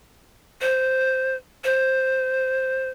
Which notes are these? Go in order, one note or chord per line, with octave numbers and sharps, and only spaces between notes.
C5
C5